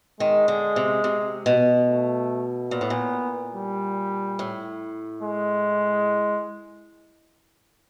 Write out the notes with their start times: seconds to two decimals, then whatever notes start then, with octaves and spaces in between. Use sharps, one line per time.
0.20 D#3 G#3
0.48 D3
0.76 C3
1.04 C3
1.46 B2
1.88 A3
2.71 A#2 B3
2.81 A2
2.90 A#2
3.55 G3
4.39 A2
5.23 G#3